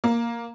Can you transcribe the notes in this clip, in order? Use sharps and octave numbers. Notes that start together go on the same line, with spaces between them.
A#3